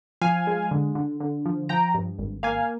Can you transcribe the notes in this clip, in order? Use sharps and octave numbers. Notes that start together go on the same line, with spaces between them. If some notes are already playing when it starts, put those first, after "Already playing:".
F3 F5 G#5
G#3
D3
D3
D3
F3
F3 G5 A#5
G2
G#1
A#3 F5 G#5